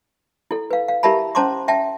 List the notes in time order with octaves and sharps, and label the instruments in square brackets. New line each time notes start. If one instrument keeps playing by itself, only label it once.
[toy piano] E4 A4
B4 F5
F5
E4 G4 A#4 E5 A5 B5
C#4 C5 A5 A#5 C6 D6
E5 G5 A5